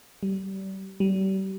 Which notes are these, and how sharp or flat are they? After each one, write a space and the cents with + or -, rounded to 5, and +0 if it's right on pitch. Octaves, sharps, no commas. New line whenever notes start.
G3 -30
G3 -35